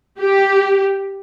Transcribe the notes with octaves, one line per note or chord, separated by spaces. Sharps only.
G4